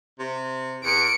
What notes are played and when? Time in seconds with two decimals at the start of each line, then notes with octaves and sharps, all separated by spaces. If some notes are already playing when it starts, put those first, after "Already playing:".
0.19 C3
0.84 E2 C#7 D7